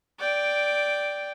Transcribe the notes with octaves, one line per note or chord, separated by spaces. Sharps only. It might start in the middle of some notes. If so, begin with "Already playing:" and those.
D5 G5